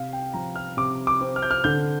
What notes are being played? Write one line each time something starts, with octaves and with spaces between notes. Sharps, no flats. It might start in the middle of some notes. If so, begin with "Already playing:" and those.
Already playing: C3 F5
G5
F3 A#5
F6
C3 D6
D6
C4
F6
G6
F6
D3 G6